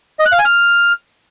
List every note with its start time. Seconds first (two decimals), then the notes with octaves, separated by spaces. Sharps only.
0.19 D#5
0.26 F#6
0.32 F5
0.39 G#5
0.45 F6